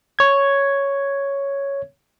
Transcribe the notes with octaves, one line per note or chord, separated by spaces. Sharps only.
C#5 G#6